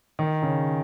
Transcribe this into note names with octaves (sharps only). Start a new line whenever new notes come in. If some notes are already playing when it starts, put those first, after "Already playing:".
D#3
C#3